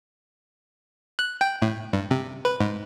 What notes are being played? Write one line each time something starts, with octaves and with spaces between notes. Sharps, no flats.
F#6
G5
A2
G2
C3
B4
G#2